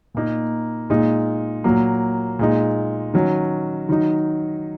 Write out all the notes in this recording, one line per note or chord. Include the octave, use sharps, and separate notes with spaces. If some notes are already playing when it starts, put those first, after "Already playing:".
A#2 A#3 D#4
A#2 G#3 D#4
A#2 F#3 A#3
A#2 G#3 D#4
D#3 F#3 C#4
D#3 F#3 D#4